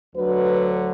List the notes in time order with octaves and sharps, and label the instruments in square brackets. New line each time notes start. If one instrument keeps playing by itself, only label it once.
[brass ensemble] D2 D3 F#3 B4